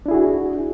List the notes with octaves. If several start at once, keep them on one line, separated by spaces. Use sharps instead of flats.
D4 E4 F#4 G#4